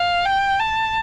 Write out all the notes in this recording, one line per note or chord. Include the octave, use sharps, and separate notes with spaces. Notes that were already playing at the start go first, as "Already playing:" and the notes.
Already playing: F5
G5
A5